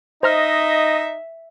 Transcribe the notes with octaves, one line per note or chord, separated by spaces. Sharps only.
D#4 C5 D#5 E5 A#5 F6